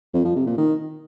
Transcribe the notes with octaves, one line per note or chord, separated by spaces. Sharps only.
F2
F3
C3
A#2
D#3